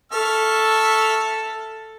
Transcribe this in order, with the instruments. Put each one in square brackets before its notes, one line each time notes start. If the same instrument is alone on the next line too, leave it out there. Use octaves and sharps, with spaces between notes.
[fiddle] A4 [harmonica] E5 C#6 F6